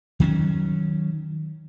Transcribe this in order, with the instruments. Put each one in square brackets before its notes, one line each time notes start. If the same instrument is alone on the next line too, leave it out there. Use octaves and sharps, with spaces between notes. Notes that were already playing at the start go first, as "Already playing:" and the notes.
[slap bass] D#3 F#3 B3 C#4